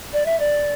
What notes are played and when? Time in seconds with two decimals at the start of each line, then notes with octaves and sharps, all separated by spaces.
0.13 D5
0.26 E5
0.40 D5